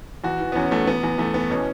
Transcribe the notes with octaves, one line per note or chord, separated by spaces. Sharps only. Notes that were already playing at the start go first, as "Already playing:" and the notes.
E2 F#4
E3
B3
E2 C#4
E2 A3
E2 B3
E2
E2 A3
E3 B3
B2 C#4